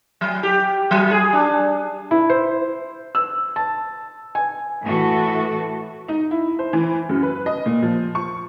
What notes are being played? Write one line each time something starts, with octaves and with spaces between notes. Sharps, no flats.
F#3
G4
F#3
G#4
D4
E4
C5
E6
A5
G#5
A2 E3 A3 F#4 A4
D#4
E4
C5
E3
F#2
B4
D#5
A#2
F3
C#6